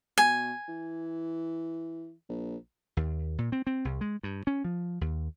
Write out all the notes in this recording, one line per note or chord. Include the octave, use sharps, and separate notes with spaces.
B2 G#5
E3
A#1
D#2
A#2
C4
C4
C2
G#3
G2
C#4
F3
D#2